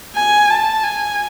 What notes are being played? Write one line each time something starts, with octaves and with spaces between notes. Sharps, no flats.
G#5
A5
G#5